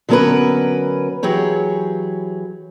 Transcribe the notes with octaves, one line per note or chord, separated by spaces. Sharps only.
D3 F#3 B3 C#4 A#4 B4
E3 F#3 G4 G#4 C#5